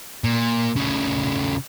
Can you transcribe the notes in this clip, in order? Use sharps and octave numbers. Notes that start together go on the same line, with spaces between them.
A#2
C#3 A3